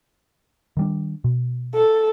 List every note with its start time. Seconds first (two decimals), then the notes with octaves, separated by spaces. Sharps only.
0.77 D#3 G3 D4
1.24 B2
1.75 A4